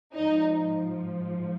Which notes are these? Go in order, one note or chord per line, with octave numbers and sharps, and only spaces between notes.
G#2 F3 D#4